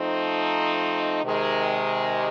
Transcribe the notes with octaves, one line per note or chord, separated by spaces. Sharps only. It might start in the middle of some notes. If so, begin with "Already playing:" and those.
Already playing: F3 A3 C4 D#4
C3 D#3 G#3